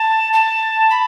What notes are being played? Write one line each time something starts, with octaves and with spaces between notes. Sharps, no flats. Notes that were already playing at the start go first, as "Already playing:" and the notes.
Already playing: A5
A5
B5